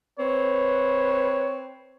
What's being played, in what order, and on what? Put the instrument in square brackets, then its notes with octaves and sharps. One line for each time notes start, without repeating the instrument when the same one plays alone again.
[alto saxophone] C4 [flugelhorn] B4 [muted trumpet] C#5